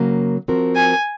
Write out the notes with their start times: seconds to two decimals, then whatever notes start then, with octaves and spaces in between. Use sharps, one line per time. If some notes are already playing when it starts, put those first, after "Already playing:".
Already playing: C#3 F#3 A#3
0.48 F3 C4 F#4 A#4
0.76 G#5